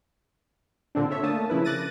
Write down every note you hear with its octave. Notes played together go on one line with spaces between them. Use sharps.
A#2 D3 C4 D4
A4 C#5 E5
A3 A#3 D4 A5 D#6
C#3 F3 E4 A#4 B4
D6 F#6 A6 A#6 D#7